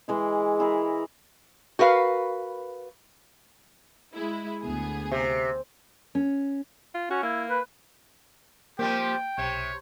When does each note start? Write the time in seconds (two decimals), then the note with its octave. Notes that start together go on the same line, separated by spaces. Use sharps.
0.08 E3 G#3 E4
0.60 E4 G#4 A#4
1.79 F#4 A#4 B4 F5
4.14 G#3 E4
4.62 D2 B3 G#4
5.12 C3
6.15 C#4
6.95 F4
7.10 C#4 F#4
7.23 A#3 E4
7.50 B4
8.79 F3 G3 A#3 C4 G4 G5
9.38 B1 C3 C#5